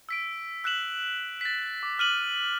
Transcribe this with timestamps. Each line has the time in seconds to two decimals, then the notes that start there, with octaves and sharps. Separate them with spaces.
0.09 E6 B6 D7
0.64 E6 F#6 B6 E7 F#7
1.41 A6 B6
1.83 D6
1.98 D6 F6 D#7 F#7